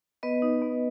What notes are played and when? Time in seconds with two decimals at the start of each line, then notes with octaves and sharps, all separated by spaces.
0.23 B3 B4 D#5
0.42 D#4
0.62 B3